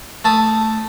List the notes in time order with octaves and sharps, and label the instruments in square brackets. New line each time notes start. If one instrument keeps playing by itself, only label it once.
[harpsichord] A3 A5 D#6